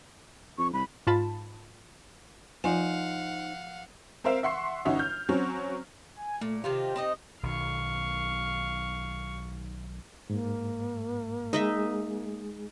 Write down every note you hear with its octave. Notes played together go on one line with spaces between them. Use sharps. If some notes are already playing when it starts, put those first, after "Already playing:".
F2 C#6
C2 B5
G#2 F4 A5 B5
F3 D#4 F4 C5 F5 F#5 G#5
C4 A#4 C5 E5 F5
E5 F#5 C6 C#6 C7
G1 C#4 D#4 F#4 C#5 E5
F6 G6
F#3 C4 C#4
G#5
A#2 A3
C3 D#3 F4 G4
C4 D#4 D#5
B1 D#3 F5 C#6
G#2 A#3
G#3 D#4 G#4 D#5 E5